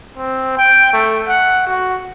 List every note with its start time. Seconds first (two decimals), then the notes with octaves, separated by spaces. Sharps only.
0.17 C4
0.57 G5
0.93 A3
1.28 F#5
1.67 F#4